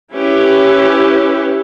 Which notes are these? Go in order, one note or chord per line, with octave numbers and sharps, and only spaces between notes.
C#4 E4 G4 B4